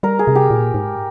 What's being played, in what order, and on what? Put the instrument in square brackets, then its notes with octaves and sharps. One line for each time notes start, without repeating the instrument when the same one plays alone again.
[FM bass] G3 [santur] A#4
[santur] G#4
[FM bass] C3
[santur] G4
[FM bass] A#2
G#2